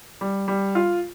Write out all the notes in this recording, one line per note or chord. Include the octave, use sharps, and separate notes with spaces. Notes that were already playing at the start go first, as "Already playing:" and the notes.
G3
G3
F4